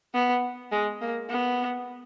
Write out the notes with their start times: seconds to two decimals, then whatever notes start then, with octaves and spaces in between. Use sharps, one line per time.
0.14 B3
0.72 G#3
1.01 A#3
1.30 B3